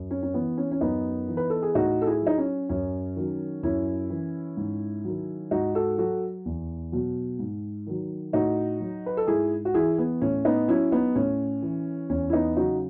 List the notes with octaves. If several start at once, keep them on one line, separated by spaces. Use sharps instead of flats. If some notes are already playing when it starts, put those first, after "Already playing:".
Already playing: F#2
C#4
C#4
E3 B3
C#4
C#4
F#2 B3 D#4
E3
B4
A4
G#4
A2 D#4 F#4
A4
E4 G#4
F#3 D#4
C#4
F#2 C#4
D#3 F#3
F#2 C#4 E4
E3
G#2
D#3 F#3
G#2 D#4 F#4
F#4 A4
F#3 F#4 A4
E2
B2 F#3
G#2
D#3 F#3
A2 D#4 F#4
F#3
B4
A4
G#2 E4 G#4
F#4
E3 E4 G#4
B3
A2 C#4
B3 D#4
F#3 C#4 E4
B3 D#4
A2 C#4
E3
E2 C#4
E4
B3 D#4
C#3 F#3 D#4 F#4